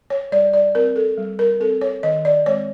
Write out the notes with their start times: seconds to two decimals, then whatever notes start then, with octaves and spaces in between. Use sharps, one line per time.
0.10 C#5
0.32 G3 D5
0.54 D5
0.75 C4 A#4
0.96 A4
1.18 G3
1.39 A#4
1.60 C4 A4
1.81 C#5
2.03 D#3 D#5
2.25 D5
2.46 G#3 C4 C#5